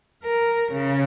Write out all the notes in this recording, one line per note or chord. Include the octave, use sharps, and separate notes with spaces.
A#4
C#3